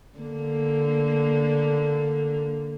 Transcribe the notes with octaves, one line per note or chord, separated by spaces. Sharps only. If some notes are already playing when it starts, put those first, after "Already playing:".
D3 A#3